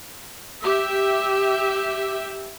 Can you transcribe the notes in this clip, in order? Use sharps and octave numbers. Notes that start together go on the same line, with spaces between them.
G4 E5